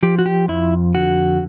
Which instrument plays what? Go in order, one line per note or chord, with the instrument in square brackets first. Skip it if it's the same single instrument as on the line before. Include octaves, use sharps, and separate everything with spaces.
[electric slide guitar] F3 G4
F#4
G4
F2 E4
D3 F#4